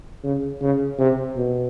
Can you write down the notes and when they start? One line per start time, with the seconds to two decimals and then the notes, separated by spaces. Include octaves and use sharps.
0.23 C#3
0.62 C#3
0.99 C3
1.37 B2